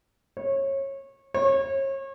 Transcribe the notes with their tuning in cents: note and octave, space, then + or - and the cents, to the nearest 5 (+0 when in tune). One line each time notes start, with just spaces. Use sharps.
C#5 -25
C#5 -35